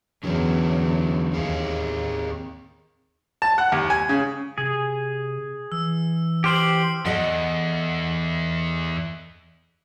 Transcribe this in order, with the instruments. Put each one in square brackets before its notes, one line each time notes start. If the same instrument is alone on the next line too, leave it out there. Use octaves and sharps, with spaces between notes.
[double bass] E2 [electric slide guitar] D3 F#3 C#4
[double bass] D#2 [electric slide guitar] C4 G#4 F5
[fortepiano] A5
F#5
D#2
G#5
C#3
[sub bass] C3 [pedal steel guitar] G#4
[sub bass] E3 [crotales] E6
[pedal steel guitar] G4 C5 [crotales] F6 C7 F#7
[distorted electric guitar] E2 [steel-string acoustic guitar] A4 D#5 F#5